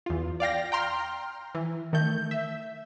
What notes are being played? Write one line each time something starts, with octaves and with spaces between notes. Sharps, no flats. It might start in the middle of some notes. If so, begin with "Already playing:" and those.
E2 F4
D5 F5 G5 A#6
G5 A#5 C6 F6
E3
D#3 A3 G6
E5